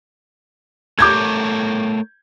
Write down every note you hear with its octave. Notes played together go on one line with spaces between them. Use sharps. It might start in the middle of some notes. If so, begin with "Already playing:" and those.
A3 A#4 C#5 D6 G6 G#6